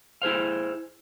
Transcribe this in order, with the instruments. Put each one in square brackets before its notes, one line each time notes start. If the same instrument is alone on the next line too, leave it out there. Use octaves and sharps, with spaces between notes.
[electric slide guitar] E4 G#4 C5 F5